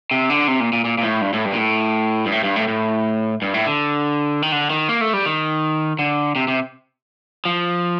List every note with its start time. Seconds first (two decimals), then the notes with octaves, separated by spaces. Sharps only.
0.11 C3
0.30 D3
0.48 C3
0.60 A#2
0.73 A#2
0.85 A#2
0.98 A#2
1.03 A2
1.21 G2
1.33 A2
1.45 G2
1.53 A#2
1.58 A2
2.26 G2
2.32 A2
2.44 G2
2.56 A2
2.68 A2
3.42 G2
3.54 A2
3.66 D3
4.42 D#3
4.52 D3
4.70 D#3
4.89 A#3
5.01 A3
5.13 G3
5.26 D#3
5.99 D3
6.36 C3
6.48 C3
7.45 F3